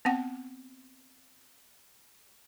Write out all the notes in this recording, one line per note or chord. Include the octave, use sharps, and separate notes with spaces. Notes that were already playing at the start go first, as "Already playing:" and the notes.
B3 C4 F#5 G5